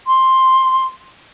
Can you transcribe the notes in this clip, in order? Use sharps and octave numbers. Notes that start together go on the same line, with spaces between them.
C6